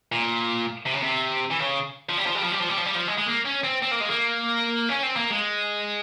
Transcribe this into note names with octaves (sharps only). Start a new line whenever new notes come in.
A#2
C3
C#3
C3
E3
C#3
F3
G3
F3
G3
F3
G3
F3
G3
F3
G3
F3
G#3
G#3
A#3
C#4
C4
C4
A#3
G#3
A#3
C#4
C4
A#3
G#3